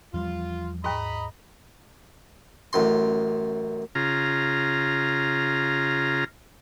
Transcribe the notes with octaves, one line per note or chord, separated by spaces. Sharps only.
E2 F3 G3 F4
D#2 G#2 D#5 A#5 B5
A1 F#2 C6
C#3 F4 A#5